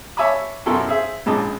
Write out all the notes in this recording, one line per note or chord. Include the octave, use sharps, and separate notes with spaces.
C#5 E5 G#5 A5 B5 D6
F#2 B2 E4 A4 A#4 C6
G#4 C5 E5
A#1 G#2 C#3 D#5 A5 D6